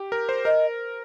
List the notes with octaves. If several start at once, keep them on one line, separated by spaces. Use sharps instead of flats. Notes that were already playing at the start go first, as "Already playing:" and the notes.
Already playing: G4
A#4
C5
A#4 D#5